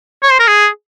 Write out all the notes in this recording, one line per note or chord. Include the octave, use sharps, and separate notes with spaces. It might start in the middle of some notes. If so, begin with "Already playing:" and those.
C#5
C5
A#4
G#4